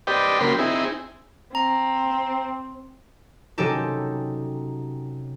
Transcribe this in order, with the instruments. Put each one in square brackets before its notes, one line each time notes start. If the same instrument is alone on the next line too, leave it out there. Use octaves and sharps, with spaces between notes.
[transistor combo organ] G4 B4 C5 D5 D#5 G5
C#3 F#3 A#3 G5 B5 C6
C4 D#4 E4 G#4
[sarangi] C4 [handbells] A#5
[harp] C3 F#3 C#4 D#4 G4 A4